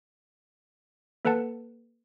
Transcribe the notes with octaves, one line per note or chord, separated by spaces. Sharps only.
A#3 A4 B4 F#5 A5